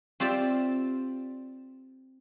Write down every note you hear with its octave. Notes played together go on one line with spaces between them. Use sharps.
C4 F4 G4 D5 E5